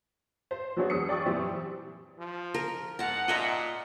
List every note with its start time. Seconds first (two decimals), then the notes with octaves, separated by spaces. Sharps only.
0.51 C5
0.77 F#3 B3 D4 F#4 G#4 C#5
0.90 E2 G#3 D#6 C#7
1.09 D5 G5 C#6 D#6
1.25 F#2 A#2 E3 G3 C4 E4
2.19 F3
2.54 A#4
2.99 G#2 F#5 A5 A#5
3.28 A#2 D#5 E5 A#5